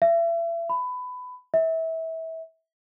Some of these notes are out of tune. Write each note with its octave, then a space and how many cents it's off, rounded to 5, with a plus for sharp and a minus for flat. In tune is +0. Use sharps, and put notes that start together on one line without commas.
E5 +35
B5 +20
E5 -25